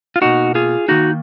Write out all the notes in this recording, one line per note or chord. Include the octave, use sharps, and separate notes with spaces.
F4
B2 A#3 D#4 F#4
F4 G#4
D#3 A#3 D#4 F#4